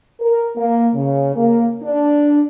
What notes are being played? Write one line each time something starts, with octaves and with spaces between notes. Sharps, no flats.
A#4
A#3
C#3
A#3
D4